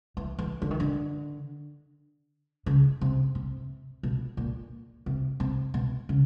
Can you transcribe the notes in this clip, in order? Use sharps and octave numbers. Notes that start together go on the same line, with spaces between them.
E3
E3
D3
D#3
D3
C#3
C3
C3
B2
A#2
C3
C3
B2
C#3